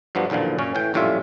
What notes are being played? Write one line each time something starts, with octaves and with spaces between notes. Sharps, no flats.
G2 F3 F#3 B3 D4
B1 E2 A#2 D3 F3
F#2 A#2 C#4
A2 E3 G5
A#1 F#2 A2 G3 F4 E5